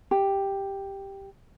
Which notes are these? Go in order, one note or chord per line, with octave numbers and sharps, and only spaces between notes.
G4